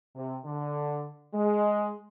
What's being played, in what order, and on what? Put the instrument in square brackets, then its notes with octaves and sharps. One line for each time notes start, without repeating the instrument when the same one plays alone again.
[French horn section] C3
D3
G#3